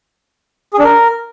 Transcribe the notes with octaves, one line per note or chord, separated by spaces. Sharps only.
G#4
D4
A#4